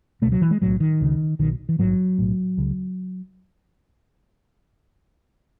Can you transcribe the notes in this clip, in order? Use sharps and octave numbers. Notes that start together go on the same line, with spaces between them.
C#2 B2 A3
F#3
E3
G#3
B1 A2 F#3
D#3
C#2 C#3
B1 B2 D#3
E3
A1 G#2 F#3
B1 A2
C#2 C#3